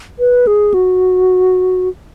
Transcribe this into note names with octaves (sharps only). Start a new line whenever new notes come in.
B4
G#4
F#4